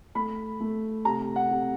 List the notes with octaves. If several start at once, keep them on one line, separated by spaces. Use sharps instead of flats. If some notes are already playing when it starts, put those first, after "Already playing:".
A3 B5
A3
C3 A#5
F#5
C3